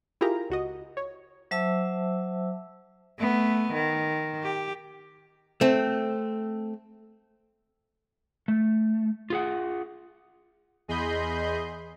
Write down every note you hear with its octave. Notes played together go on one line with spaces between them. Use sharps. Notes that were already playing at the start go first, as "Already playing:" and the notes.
E4 F4 G4 G#4 A#4 A#5
C#2 F#4 D#5
C#5
F#3 C5 E5 A5 D6 E6
A3 B3
D#3
G4
A3 C4
A3
F4 G#4 F#5
E2 G#4 D#5 B5 C6 G6